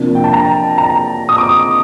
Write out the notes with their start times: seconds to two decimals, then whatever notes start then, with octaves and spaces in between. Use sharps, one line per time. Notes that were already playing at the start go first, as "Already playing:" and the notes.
Already playing: C3 F3 A#3 D4
0.15 G5
0.24 A5
0.33 A#5
0.78 A#5
1.29 D#6
1.38 D6